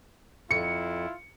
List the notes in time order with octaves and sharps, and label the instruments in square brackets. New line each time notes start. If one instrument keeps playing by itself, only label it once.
[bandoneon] F2 [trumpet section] E4 F4 [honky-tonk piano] C#7